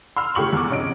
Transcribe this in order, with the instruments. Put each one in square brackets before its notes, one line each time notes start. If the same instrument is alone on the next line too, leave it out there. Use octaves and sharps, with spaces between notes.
[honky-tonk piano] C6 E6 F6
C#3 A3 G4 C#6 F#7
E2 D6
C3 C#4 D#5 D7